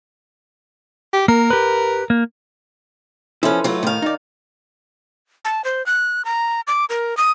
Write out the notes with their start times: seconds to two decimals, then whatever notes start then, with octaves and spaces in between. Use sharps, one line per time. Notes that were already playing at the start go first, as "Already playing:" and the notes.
1.13 G4
1.28 A#3 A#4
1.50 G4 B4
2.10 A#3
3.43 F3 C#4 E4 A4 B4
3.64 F#3 A3 F4
3.83 A2 D#3 F5
4.02 D#4 D5
5.45 A5
5.64 C5
5.86 F#6
6.25 A#5
6.67 D6
6.90 A#4
7.17 D#6